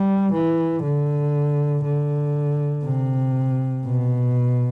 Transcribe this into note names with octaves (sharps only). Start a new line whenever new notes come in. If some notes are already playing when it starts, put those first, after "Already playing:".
Already playing: G3
E3
D3
D3
C3
B2